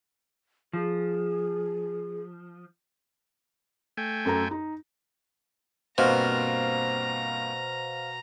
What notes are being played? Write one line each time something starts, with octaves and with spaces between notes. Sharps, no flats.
F3 G#4
A3 G5 G#5
F#2 A4 A#5
D#4
G2 B2 A#3 C4 C5 F5 A#5 F6